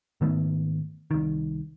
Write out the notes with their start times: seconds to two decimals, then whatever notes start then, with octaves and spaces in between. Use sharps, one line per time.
0.21 G#2 D#3 A3 B3
1.11 C2 D#3